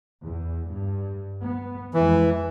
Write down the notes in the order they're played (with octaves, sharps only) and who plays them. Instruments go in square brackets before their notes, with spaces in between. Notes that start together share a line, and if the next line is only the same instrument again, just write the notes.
[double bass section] E2
G2
B3
[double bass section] F2 G#3 [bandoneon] E3